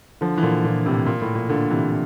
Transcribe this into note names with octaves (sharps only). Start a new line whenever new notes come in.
D3 F3
E3
A#2 D3
A#2 D3
A2 C3
A#2
A2
A#2
A#2 D3
C3 E3